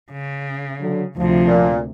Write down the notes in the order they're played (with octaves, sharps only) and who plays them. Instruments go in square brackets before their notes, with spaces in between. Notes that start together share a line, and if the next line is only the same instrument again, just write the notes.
[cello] C#3
[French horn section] D3 F#3
[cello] D2 C3 [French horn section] F3
[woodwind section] A#2